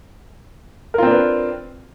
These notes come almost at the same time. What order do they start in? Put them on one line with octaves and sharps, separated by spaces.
A#4 F4 C4 D4 B4